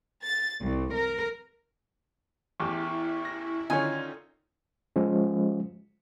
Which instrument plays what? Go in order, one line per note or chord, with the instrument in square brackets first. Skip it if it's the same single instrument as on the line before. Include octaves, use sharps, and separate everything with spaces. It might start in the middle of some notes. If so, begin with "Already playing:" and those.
[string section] A6
C2
A#4
[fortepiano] A1 E2 G4 [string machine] E4
[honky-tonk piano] A#6
[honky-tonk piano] D3 D#3 C#4 [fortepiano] D#4 F4 C#5 [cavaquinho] G#5
[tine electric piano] F3 G#3 C#4